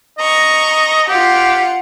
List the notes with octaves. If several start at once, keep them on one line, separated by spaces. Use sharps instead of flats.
D#5 A#5 C#6
F4 G4 F5 F#5